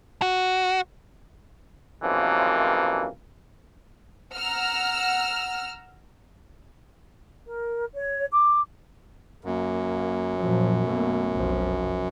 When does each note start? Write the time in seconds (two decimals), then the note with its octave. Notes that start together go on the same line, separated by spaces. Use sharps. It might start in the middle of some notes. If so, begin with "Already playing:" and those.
0.22 F#4
2.02 B1 F#2 C3 E3 F3 A#3
4.34 F#5 A#5 E6 F6
7.46 A#4
7.93 C#5
8.32 D6
9.45 F#2 A#3
10.38 A#2 F3 F#3
10.84 B2 A3 A#3
11.33 F1 B1 F3